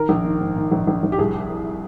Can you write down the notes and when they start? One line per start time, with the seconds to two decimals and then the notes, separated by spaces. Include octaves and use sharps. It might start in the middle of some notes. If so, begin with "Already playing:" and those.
Already playing: D#3 A#4
0.09 A#1
0.25 D#3
0.40 G#2
0.56 D#3
0.72 A#1
0.87 A#1
1.03 A#1
1.12 G4
1.18 C2 G#4